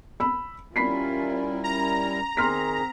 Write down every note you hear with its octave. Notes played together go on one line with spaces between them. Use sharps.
B5 E6
G3 C#4 E4 F4 A#4 B5 B6 C7
C#4 A#5
D#3 C4 G#4 C6 F6 B6